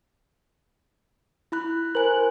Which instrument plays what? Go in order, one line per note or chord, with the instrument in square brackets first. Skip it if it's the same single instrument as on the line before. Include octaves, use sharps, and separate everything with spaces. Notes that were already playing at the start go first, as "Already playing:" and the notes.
[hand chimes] E4 B5 F#6
[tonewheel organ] A#4 F#6 [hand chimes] C5 G#5